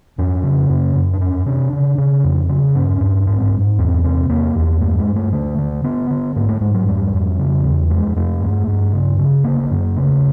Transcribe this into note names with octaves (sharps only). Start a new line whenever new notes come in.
F2 C#4
C#3
F#2
F#2
D4
F2 C#4
C3 D4
C#3
C#3
F2
C#3
G2 C#4
G2
G#2 C4
G#2
E2 C4
C3 C4
E2 A#3
E2
G2 A3
G#3
G2
A3
D3 A3
D3
D3 B3
D3
G#2 A#3
A3
G#2 G#3
F#3
F2 G3
F2
C#3
E2
F2 G#3
F2 A3
G2
G2
C#3
C#3
D3 A#3
F#2
C#3 A3